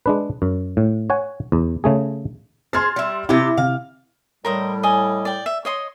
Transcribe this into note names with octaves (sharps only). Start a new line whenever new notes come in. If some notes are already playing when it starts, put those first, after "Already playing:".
G#3 D4 B4
F#2
A2
C#5 F#5 G#5
E2
C#3 A3 G#4
G#4 C5 C6 F6 A6
G3 E5
C3 E4 G4
C3 F5
A2 G3 A#4 C5 D#5
D5 D#5 G#5
D5 G5
E5
C#5 D#5 C6